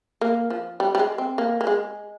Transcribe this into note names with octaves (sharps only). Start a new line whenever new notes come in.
A#3
F3
G3
G3
G#3
C4
A#3
A#3
G#3